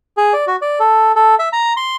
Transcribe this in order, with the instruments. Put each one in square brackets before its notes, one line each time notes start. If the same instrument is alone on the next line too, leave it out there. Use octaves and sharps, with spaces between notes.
[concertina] G#4
D5
F#4
D5
A4
A4
E5
A#5
C6